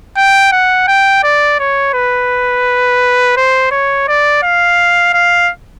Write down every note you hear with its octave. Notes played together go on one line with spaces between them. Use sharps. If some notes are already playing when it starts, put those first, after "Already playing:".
G5
F#5
G5
D5
C#5
B4
C5
C#5
D5
F5
F5